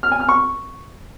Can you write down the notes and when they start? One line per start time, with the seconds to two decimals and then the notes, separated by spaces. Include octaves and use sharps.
0.03 F6
0.12 G#5
0.20 F6
0.29 C#6